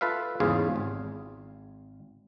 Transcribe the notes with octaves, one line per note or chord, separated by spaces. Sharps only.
F4 A4 B4 E5 F5
E2 G#2 C#3 F4 G#4 F5
G#1